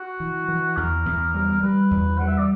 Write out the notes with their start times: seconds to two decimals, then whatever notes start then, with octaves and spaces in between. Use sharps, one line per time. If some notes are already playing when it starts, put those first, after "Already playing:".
Already playing: F#4
0.20 E3
0.48 E3
0.77 E2 A#4
1.06 E2
1.34 G3
1.63 G3 B4
1.91 E2
2.18 G3 F#5
2.28 E5
2.38 D5